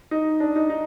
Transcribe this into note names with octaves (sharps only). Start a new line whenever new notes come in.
D#4
D4
D#4
D#4